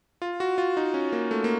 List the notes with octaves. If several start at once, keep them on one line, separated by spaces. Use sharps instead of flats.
F4
F#4
F4
D#4
C#4
A#3
A3
A#3